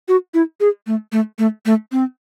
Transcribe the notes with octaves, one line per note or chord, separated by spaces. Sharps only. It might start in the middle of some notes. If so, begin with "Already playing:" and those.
F#4
E4
G#4
A3
A3
A3
A3
C4